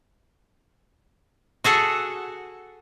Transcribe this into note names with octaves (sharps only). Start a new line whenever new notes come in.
F#4 G#4 A4 F#5